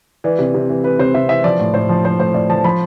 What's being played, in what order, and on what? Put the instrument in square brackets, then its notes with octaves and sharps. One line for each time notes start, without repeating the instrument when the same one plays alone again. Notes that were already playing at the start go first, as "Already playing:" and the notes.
[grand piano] E3 D5
C3
C3
E3
E3 B4
C3 C5
C3 E5
E3 E5
F3 D5
A2
A2 C5
F3
F3 C5
A2 C5
A2 D5
F3 A5
F3 B5